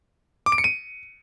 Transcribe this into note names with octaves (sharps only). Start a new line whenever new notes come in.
D6
D7
C#7
D#7